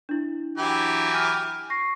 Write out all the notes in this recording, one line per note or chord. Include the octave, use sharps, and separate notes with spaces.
D4 E4
E3 F#3 G4
G#5 F6 D#7
C#6 A#6 C7